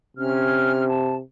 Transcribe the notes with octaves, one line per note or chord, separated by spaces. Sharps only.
C3 C#4 F6
A5